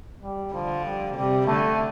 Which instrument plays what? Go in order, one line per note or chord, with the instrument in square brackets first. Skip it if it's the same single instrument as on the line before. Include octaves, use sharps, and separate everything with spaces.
[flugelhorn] G3
[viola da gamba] D3 [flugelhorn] F3
[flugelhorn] G3
[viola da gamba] C3 [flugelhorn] G3
[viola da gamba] D3 [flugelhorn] A3